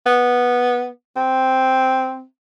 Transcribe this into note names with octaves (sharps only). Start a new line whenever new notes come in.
B3
C4